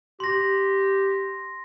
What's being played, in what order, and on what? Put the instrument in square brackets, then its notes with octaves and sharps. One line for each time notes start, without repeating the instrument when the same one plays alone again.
[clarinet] G4 [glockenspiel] C6 A#6